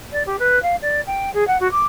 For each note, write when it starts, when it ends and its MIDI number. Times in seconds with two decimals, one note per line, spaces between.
0.12 0.23 74
0.26 0.37 67
0.39 0.61 71
0.63 0.76 77
0.82 1.01 74
1.07 1.33 79
1.34 1.46 68
1.47 1.57 78
1.60 1.70 66
1.72 1.86 86